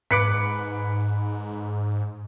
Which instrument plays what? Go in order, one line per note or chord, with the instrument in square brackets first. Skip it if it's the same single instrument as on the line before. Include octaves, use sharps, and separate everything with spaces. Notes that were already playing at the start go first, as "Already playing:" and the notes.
[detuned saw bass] G#2 [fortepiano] B4 D6 [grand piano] B6 C#7 D7